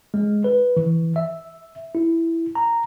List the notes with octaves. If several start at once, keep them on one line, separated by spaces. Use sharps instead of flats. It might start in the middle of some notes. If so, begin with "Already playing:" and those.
G#3
B4
E3
E5
E4
A#5